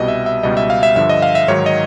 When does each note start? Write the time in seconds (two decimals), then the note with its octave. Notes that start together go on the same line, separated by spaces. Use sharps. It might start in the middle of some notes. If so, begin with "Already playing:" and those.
Already playing: C2 B2 G3 D#5
0.08 E5
0.26 E5
0.43 C#2 B2 G3 D#5
0.57 E5
0.70 F5
0.83 E5
0.96 G2 D3 F3 E5
1.09 D#5
1.22 F5
1.35 E5
1.48 G#2 D#3 F#3 C#5
1.66 D#5